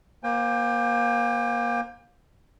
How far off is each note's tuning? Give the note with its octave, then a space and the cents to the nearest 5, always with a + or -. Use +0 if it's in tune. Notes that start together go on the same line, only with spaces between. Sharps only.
A#3 +25 C5 +0 G5 +45